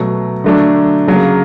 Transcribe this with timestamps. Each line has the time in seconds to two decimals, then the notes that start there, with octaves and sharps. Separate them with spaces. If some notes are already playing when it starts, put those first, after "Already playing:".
Already playing: B2 F#3 A3
0.44 D3 F#3 A3 D4
1.07 C#3 F#3 A#3